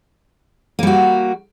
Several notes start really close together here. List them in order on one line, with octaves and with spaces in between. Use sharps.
A#3 G3 F#4